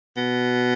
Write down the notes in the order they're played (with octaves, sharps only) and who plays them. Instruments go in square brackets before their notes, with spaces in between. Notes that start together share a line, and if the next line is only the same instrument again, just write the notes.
[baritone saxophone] B2